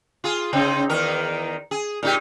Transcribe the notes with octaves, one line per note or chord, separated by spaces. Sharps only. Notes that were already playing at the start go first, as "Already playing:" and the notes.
F4 G#4
C#3 C4 D#4
E2 D#3 A#4
G#4
A#2 D#4 G4